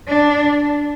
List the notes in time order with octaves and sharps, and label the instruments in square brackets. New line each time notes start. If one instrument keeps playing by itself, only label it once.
[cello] D4